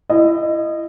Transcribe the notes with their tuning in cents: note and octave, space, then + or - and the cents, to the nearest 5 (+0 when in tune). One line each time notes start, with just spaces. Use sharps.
E4 +20 D#5 -15